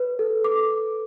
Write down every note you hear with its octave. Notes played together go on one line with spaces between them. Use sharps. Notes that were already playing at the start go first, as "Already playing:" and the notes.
Already playing: B4
A4
D6